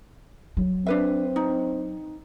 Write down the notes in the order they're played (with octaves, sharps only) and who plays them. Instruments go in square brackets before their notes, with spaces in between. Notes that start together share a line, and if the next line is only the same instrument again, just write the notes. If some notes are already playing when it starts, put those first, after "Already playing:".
[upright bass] F#3
[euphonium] C4 [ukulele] D4 B4 E5
[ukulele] D#4